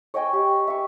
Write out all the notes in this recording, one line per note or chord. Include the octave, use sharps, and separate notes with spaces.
C#5 D#5 G5 G#5
G4
E5 C#6